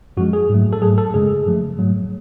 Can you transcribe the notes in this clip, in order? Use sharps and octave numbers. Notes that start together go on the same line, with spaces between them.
F#2 F3 G#3 F#4
G#4
G#2 F#3 A3
A4
G#2 F#3 A3 G#4
A4
F#2 C#3 G#3 G#4
F#2 F3 A3
G#2 F#3 A3